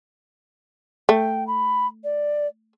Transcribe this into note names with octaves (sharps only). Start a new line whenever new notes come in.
A3 G5
B5
D5